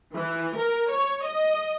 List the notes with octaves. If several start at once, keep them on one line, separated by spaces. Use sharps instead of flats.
E3
A#4
C#5
D#5